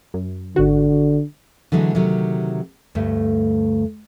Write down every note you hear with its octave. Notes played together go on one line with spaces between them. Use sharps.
F#2
G#1 D3 F#4
D3 E3 F#3 G#3 A3
C3 D#3 F#3
D2 G2 A3